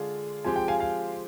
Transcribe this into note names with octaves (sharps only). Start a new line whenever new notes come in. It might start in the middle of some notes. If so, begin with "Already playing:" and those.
Already playing: D3 G#3 D4 F4 G#4
F3 G#3 C4 G4 G#5
G5
F5 G#5
F5 G#5